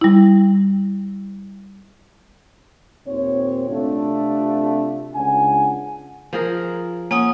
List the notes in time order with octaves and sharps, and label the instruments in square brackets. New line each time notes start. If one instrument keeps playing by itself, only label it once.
[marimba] G3 E4
[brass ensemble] D#2 A#2 C4 C#5
C3 A3 D4 F4
C#2 C#3 D4 F#5 G#5
[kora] F3 G#4 A#4
[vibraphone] A#3 F#5 D#6 [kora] C#4